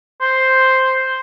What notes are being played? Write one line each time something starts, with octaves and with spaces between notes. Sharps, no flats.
C5